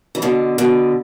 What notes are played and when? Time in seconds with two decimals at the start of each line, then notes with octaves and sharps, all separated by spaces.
0.15 E3
0.22 B2 D3
0.58 B2 D3